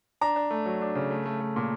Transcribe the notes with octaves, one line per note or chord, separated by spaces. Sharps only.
D4 A#5
D4
A3
F#3
D4
C#3
A3
A3
A3
A#2